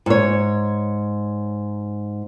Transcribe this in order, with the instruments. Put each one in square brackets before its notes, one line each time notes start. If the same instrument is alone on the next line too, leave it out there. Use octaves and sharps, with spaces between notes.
[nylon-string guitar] G#2 C#5